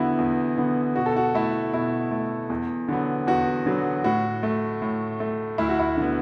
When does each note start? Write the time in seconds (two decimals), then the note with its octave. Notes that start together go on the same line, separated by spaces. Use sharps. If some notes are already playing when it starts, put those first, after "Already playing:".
Already playing: E2 D3 B3 E4 F#4
0.19 E2
0.57 D3 B3
0.96 B2 F#4
1.06 A4
1.16 F#4
1.35 A3 E4
1.73 B2 E4
2.11 A3
2.50 E2
2.88 D3 F#3 B3
3.27 E2 F#4
3.66 D3 F#3 B3
4.04 A2 F#4
4.43 A3
4.82 A2
5.20 A3
5.58 D2 E4
5.69 F#4
5.79 E4
5.97 D3 B3